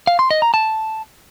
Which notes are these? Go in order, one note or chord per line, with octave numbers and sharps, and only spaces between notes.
F5
C6
D#5
A#5
A5